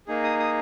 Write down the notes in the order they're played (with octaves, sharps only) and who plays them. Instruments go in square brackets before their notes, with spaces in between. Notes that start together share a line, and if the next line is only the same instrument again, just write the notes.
[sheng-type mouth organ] A#3 D#4 G#4
D#6
D#6